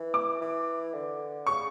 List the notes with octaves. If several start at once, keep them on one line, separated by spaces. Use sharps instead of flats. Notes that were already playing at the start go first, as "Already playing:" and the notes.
Already playing: E3
D6
E3
D3
C#3 C#6